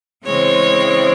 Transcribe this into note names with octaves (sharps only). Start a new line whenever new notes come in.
C#3 E3 G#3 C4 C#5